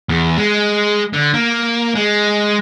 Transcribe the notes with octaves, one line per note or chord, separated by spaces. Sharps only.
E2
G#3
D3
A#3
G#3